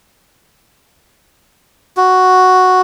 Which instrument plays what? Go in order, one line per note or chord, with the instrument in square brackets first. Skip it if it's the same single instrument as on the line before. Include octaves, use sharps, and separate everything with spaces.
[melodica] F#4